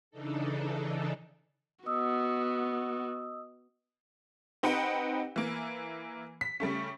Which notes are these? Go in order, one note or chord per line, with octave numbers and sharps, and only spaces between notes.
C#3 E3 D4 D#4 A4
B3 F#4 D#5 D#6 E6
C4 D#4 G4 B4 F#5 G5
E3 A#3
B6
C#3 G3 A3 C#4